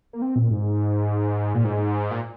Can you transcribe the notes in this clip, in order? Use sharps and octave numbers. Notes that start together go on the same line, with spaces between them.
A#3
C4
A#2
G#2
A#2
G#2
A#2